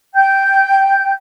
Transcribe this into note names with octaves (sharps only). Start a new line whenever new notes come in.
G5 G6